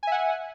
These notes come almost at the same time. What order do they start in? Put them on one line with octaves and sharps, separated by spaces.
G#5 E5 F#5